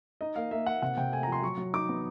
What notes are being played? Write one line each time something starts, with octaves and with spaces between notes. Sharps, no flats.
D#4 D#5
A#3 F5
A#3 E5
A#3 F#5
C3 F#5
C3 G5
A3 G#5
F3 A#5
C6
F#3 C#6
F#3
D#4 D6
B3